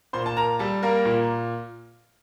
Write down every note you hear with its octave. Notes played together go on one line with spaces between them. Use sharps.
A#2 C5 C6
A5
A#4 A#5
G3 A4 A5
A#3 A#4
A#2